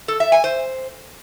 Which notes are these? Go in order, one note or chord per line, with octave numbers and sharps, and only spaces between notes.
A4
E5
G#5
C5